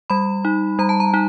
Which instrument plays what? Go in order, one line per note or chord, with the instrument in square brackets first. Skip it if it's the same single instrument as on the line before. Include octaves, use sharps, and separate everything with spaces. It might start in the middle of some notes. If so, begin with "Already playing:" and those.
[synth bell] G3 B5
D#4
G3 A#5
A5
A#5
D#4